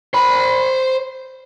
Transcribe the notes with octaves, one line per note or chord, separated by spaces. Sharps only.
C5 B5